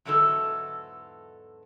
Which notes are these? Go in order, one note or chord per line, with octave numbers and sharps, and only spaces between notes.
E2 G#2 D3 F#3 A4